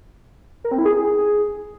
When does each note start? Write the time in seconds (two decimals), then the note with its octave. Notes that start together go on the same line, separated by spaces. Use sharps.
0.64 A#4
0.71 C4
0.78 E4
0.85 G#4